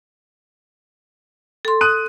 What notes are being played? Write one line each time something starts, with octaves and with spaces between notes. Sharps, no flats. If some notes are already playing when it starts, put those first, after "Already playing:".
A4 C6
D#6 F#6 D#7